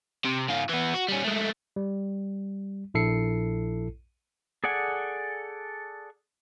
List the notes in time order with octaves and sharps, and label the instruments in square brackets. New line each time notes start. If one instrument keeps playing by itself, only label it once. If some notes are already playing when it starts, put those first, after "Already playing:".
[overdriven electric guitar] C3
G#2 F4
E3 B3
F#4
G3 C#4
G#3 A3
[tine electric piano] G3
A#1 E4 A4 C7 C#7
[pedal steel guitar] G#4 A4 D5 F#5 G#5